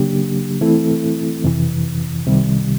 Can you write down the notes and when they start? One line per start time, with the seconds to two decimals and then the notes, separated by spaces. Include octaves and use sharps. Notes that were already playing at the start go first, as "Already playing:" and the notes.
Already playing: C#3 F#3 A#3 D4 G4
0.61 E3 A3 C4 E4 A4
1.44 F2 C3 E3
2.26 C2 C3 D#3 G3